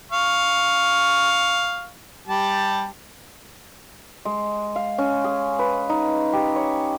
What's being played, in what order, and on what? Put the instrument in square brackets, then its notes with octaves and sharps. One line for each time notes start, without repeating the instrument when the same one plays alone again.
[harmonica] F5 C#6
G3 G4 A5
[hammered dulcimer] G#3
F5
C#4
G#4
B4
D#4
G4
C#5